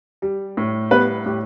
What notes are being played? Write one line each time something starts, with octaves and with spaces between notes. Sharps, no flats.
G3
A2
G3 B3 B4
A2 G4